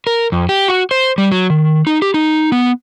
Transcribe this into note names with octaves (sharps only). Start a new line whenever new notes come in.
A#4
F2
G4
F#4
C5
G3
F#3
D#3
D#4
G4
D#4
B3